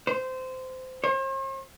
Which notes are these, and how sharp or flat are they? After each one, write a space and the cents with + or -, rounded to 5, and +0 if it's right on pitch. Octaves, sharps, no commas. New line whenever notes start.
C5 -20
C5 +45